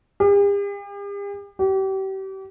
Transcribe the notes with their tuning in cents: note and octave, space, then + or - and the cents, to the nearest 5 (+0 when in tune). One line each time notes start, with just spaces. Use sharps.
G4 +45
G4 -35